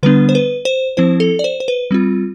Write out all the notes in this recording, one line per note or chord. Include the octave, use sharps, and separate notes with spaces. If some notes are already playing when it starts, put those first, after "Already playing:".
D3 G3 B3 D4 B4
C5
B4
C5
F3 C4 E4 C5
A4
D5
C5
C5
B4
G3 C4 F4